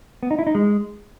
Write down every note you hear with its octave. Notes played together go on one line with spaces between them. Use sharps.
B3
D#4
E4
D#4
G#3